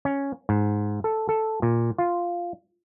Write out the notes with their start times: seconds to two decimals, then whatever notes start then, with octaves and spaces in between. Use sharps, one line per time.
0.05 C#4
0.49 G#2
1.04 A4
1.29 A4
1.62 A#2
1.98 F4